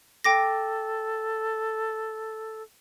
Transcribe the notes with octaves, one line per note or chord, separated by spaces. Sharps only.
A4 G5 D6 A#6